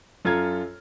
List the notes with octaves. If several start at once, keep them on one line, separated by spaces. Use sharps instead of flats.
F#2 F4 A4 A#5 F6 G#6